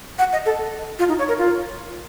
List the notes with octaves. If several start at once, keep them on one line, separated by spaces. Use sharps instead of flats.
F#5
D#5
A4
F4
D#4
C#5
A#4
F4